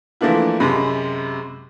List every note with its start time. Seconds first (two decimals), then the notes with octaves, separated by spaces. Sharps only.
0.21 E3 F3 A3 A#3 D4 E4
0.60 F#2 C3 G#3 B5